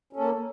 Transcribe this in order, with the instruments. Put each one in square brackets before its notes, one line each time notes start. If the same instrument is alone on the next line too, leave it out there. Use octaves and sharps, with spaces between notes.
[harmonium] C#4
A4
A#3